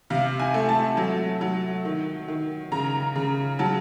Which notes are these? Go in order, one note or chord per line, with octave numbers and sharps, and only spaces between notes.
C3 F5
G#5
A3
A5
F#3
F#3
D#3
D#3
C#3 A#5
C#3
F#3 A5